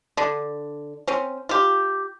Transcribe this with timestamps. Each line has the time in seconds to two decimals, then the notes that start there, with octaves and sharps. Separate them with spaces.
0.17 D3 D4
1.07 C4 C#4
1.49 F4 G4